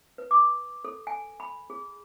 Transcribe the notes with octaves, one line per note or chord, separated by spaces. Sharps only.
B4
D6
A4
G#5
B5
G#4